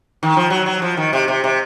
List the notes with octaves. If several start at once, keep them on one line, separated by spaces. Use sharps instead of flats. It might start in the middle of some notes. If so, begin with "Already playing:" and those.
D#3
F3
F#3
F#3
F3
D#3
C3
C3
C3